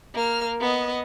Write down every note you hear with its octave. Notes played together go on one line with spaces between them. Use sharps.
A#3 F6
B3 D#5